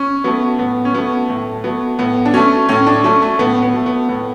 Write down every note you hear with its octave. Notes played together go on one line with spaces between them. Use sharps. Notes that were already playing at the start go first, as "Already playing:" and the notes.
Already playing: C#4
F#3 A3 B3
A2 B3
C#4
F#3 A3 B3
A2 A3
F#3 A3 B3
A2 B3
D4
F#3 A3 C#4
A2 C#4
D4
F#3 A3 C#4
A3
A2 B3
B3
F#3 A3
B3
A2 B3